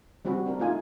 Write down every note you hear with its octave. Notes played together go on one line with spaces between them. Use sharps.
G3 C4 C#4 F#4 B5
C4 D4 A#4
A3 D#4 F4 G#5